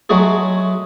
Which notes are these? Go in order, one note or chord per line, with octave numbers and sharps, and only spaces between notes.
F#3 G#3 A3 F#4 G#4